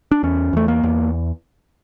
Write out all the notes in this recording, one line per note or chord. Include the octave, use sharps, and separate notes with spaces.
D4
E2 C#4
E2 A3
A#3
E2